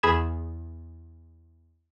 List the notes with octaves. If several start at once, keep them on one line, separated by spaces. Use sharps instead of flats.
E2 G#4 B5 G#6 E7